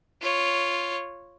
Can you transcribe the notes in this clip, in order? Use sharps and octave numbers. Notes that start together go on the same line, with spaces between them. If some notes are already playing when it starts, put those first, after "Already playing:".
F4 C#5